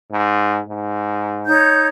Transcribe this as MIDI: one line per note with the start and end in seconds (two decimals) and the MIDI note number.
0.12 0.60 44
0.69 1.54 44
1.47 1.88 63
1.47 1.88 73
1.47 1.88 91